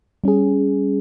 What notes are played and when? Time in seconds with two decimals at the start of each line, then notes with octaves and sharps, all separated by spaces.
0.24 G3 C#4 G#4